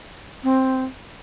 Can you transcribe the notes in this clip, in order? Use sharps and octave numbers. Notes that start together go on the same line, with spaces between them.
C4